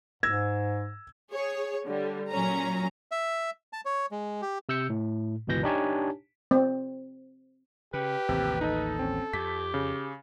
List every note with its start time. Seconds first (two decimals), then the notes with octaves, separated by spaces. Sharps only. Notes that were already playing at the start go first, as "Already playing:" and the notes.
0.23 G#2 E6 G#6 A#6
1.32 G#4 C#5
1.86 D3 G3
2.30 A#2 F#3 C#4 A#5
3.11 E5
3.73 A5
3.85 C#5
4.11 G#3
4.42 G4
4.69 C3 E6 G6 C#7
4.90 A2
5.47 G1 C#2 B2 E3 G6 A#6
5.63 D4 D#4 G4 C#5 G#5 A5
6.51 C4
7.94 C#3 G4 B4
8.29 A1 D#2 C3
8.61 D#4 A4 D#5
8.99 C4 C#4
9.33 F2 G4 B6
9.74 C#3